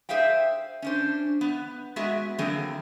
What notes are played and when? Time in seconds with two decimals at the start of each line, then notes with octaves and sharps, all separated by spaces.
0.09 G#4 C5 E5 F5 G5
0.82 C#4 D4 C5
1.41 B3
1.96 G#3 B3 F#4 G#4 E5
2.38 D3 E3 F#3 A#3 C4 G#4